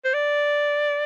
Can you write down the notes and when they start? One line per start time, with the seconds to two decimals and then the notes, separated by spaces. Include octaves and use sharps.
0.05 C5
0.14 D5